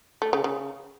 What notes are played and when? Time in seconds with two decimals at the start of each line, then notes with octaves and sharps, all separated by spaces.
0.22 A3
0.33 C#3
0.44 C#3